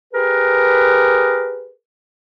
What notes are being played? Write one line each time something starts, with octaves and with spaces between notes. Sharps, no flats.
G4 G#4 A#4 B4